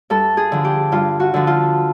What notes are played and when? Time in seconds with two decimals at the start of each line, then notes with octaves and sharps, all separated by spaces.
0.10 G2 A4
0.37 G#4
0.52 D3 F3
0.65 G4
0.92 G2 F4
1.20 F#4
1.34 D3 F3
1.47 F4